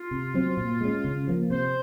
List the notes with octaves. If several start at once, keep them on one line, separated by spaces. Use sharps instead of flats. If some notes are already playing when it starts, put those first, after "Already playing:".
Already playing: F4
C3
F#3 C4
A#2
G#3 C#4
C#3
F3 A#3
C3 C5